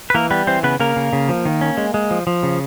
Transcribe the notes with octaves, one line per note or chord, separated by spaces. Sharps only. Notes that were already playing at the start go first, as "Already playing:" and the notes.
B4
E3 A#3 A#4
G3 B3 B4
E3 C4 C5
C#3 B3 B4
C#3 A#3 A#4
C#3
C#3
F3
D#3
C#4
G#3
G#3
F3
F3
C#3